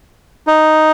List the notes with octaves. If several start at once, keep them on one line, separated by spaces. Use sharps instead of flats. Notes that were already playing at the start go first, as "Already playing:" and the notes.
D#4